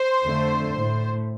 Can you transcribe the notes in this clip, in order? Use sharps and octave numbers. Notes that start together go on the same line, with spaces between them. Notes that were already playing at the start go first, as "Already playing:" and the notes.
Already playing: C5
F2 D3 A3
A2 A3